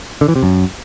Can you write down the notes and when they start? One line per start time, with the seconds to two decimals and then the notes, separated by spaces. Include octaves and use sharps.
0.21 D3
0.28 E3
0.36 C3
0.43 F#2